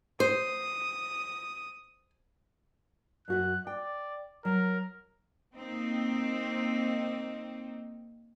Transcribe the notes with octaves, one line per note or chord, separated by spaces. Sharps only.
C5 D#6
F#2 F#4 E5 F#6
D5 G5
F#3 A#4
A#3 C4 D#4